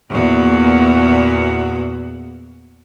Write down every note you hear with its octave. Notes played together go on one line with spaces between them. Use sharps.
E2 A#2 F#4